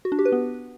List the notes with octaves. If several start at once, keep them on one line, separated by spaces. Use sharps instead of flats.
F#4
D4
G4
B4
B3